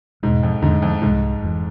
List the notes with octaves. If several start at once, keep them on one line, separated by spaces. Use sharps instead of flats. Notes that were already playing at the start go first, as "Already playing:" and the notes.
E2 G#2 B2 G#3
F2
E2 G#2 D3 A3 D4
F2
C2 G#2 C3 G#3
F1 F2 E3